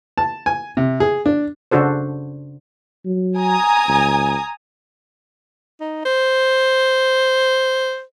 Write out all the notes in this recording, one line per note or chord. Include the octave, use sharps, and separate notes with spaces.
A5
G#5
C3
G#4
D4
C#3 D4 F#4 A4 C5
F#3
G#5 A#5 D#6
C#2
D#4
C5